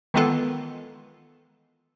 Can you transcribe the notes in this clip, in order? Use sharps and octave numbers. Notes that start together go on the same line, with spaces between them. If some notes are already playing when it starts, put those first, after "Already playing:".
D#3 E3 G#3 B3 F4 A4